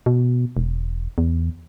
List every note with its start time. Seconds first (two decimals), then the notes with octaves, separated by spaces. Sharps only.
0.06 B2
0.57 E1
1.18 E2